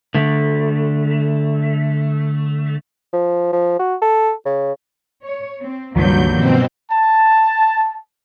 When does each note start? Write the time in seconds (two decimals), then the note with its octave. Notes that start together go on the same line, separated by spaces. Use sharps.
0.15 D3 A3
3.13 F3
3.53 F3
3.79 F#4
4.02 A4
4.45 C#3
5.24 C#5
5.60 C4
5.96 C#2 G2 D#3 F3 F#3 A#3 G6
6.34 B2 D#3 F3 C4
6.90 A5